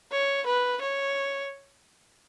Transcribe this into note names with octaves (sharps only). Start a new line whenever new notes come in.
C#5
B4
C#5